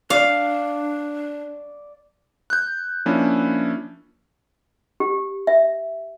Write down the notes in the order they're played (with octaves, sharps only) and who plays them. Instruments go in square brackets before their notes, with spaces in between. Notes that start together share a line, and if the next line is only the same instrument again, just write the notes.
[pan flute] D4 [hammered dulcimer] D5 [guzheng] F5
[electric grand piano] F#6 G6
F3 A#3 C#4 D4 E4
[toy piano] G4
E5